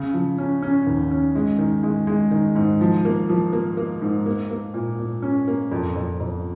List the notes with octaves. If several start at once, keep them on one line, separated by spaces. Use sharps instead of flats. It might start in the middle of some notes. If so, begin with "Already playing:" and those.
Already playing: C#3
F3
C#4
C#4
D#2
C#4
G#3
D#3
G#3
G#3
D#3
G#2
F3
A#3
F3
A#3
A#3
G#2
A#3
A#3
A#2
A#2
C#4
A#3
F2
F2
F2